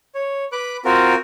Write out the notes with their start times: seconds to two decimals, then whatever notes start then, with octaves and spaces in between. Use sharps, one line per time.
0.15 C#5
0.52 B4 D6 F#6
0.85 C4 F4 F#4 A#4